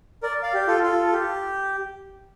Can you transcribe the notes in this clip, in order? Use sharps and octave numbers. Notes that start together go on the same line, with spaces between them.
A#4 D5
D5 F5
G4
F4 A4
F4 A4
A4
G4